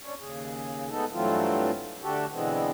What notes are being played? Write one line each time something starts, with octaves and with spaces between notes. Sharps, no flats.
C#4 D4 C#5
D#2 C#3 G#4
G#3 A3 B3 D#4 A4
G2 E3 F#3 A3 C4 F4
D3 A3 F#4 G4 A4
B2 D3 E3 G#3 B3 C4